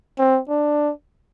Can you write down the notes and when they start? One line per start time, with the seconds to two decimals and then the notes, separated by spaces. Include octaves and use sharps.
0.19 C4
0.49 D4